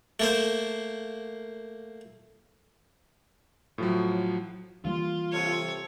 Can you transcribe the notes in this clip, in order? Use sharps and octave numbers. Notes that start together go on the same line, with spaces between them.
A3 A#3 C5
A2 F3 F#3
E3 G3 A#3 F4
C3 A4 C#5